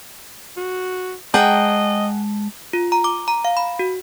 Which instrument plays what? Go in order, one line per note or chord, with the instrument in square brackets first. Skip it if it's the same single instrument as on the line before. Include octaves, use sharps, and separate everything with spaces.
[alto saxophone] F#4
[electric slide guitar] G#3 A5 A#5 [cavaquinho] G#4 F#5 G5 [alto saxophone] D#5
[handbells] F4
A#5
D6
A#5
F5
B5
F#4